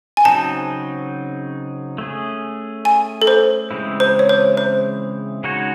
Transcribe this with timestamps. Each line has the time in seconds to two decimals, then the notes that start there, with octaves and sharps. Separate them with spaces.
0.17 G#5
0.25 C#3 F#3 C4 D#4 A5
1.98 A3 C#4 G#4
2.85 G#5
3.22 A4
3.27 C5
3.71 C#3 E3 G#3 C4 E4
4.00 C5
4.19 C#5
4.29 C5
4.57 C5
5.44 C#3 G#3 D#4 F#4 C#5